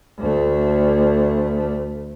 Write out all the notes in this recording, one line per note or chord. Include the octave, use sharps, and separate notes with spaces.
D2 A3